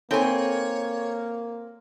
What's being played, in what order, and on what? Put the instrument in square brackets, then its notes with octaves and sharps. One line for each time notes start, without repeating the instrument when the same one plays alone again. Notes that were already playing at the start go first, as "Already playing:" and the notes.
[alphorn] A#3 [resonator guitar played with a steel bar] C4 G#5 [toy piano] D#4 A4 B5 [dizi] C#5